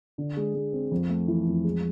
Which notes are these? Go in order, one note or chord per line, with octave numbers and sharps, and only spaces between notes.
D3
G#3
G#3
C4
F2
A3
E3
F2
G#3